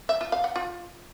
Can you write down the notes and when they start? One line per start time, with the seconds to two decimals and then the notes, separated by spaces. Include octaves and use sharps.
0.09 E5
0.21 F4
0.32 F5
0.44 F#5
0.56 F4